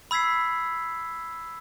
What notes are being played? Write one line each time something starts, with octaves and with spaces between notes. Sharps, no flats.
B5 E6 G#6 B6 C7